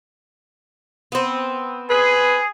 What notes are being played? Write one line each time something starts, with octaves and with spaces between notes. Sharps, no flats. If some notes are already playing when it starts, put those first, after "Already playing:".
B3 C4
G#4 B4